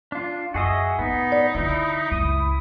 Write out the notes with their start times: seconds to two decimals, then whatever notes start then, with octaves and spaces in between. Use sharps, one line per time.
0.12 D4 F4
0.54 F#2 F#4 G#4 D#5 E5
0.99 A2 B3 D#4
1.32 D5
1.55 D3 E4 F4
2.11 C#2 F#2 D#6